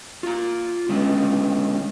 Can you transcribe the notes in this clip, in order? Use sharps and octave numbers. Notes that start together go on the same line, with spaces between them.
F4 A#5
D3 G#3 B3 C#4